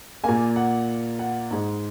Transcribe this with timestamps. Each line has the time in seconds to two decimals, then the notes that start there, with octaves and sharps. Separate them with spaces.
0.24 A#2 A#3 G#5
0.56 F#5
1.19 F#5
1.51 G#2 G#3